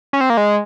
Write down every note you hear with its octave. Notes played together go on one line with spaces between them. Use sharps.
C#4
C4
A#3
G#3